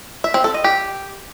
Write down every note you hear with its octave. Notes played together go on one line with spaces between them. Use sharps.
E5
C4
A4
D#5
G4